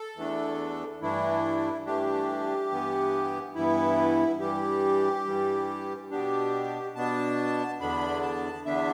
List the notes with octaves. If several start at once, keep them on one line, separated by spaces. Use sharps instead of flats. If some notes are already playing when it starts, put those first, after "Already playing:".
Already playing: A4
E2 E3 A3 D4
G2 E3 A3 D4 E4
G2 E3 A3 D4 G4
G2 E3 B3
G2 E3 B3 E4
G2 E3 G3 G4
G2 E3 G3
B2 B3 D4 G4
B2 B3 D4 A5
E2 D3 B3 D4 B5
A5
E2 D3 B3 D4 E5